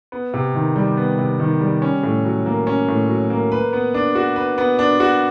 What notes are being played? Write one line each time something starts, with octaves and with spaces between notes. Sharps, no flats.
B3
C3
D#3
G3
B3
C3
D#3
G3
C#4
A2
F#3
A#3
C#4
A2
F#3
A#3
B4
B3
D4
F#4
B4
B3
D4
F#4